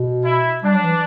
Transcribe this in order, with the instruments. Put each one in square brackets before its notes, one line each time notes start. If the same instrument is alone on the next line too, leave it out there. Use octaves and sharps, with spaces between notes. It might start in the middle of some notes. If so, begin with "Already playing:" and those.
Already playing: [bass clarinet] B2
[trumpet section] E4
[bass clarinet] G3 [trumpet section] D4
[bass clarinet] F#3
E3